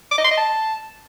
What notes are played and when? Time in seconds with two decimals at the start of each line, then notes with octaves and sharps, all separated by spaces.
0.11 D6
0.18 D#5
0.24 C6
0.31 D#5
0.37 A5